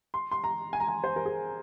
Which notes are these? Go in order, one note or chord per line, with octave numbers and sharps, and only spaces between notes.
C6
C6
A#5
G#5
A#5
G#5
C5
A#4
G#4